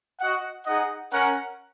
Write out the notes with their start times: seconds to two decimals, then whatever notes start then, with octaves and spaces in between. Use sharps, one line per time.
0.21 F#4 D#5 F#5
0.66 D#4 G#4 D#5 F#5
1.11 C#4 A#4 F#5